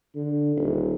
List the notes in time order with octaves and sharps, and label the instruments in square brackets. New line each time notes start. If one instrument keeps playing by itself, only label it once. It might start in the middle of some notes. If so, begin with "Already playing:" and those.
[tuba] D3
D#1